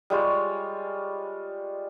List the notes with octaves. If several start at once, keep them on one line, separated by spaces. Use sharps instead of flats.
G3 G#3 F4 C#5